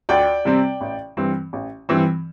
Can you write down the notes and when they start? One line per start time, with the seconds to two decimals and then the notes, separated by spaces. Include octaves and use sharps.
0.09 D2 D5 G5
0.45 C3 G3 C4
0.81 A1
1.17 G2 E3 C4
1.53 A1
1.89 G2 E3 C4